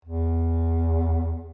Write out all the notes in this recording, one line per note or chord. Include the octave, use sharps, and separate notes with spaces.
E2